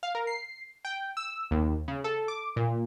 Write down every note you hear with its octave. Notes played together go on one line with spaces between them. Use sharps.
F5
A#4
C7
G5
E6
D#2
C#3
A4
D6
A#2